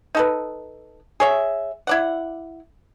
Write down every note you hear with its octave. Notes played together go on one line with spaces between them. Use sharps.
D#4 A4 B4
G#4 C#5 E5
E4 D5 F#5